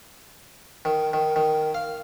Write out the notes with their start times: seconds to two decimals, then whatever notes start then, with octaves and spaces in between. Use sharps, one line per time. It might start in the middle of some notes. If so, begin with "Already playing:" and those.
0.85 D#3
1.13 D#3
1.36 D#3
1.74 F5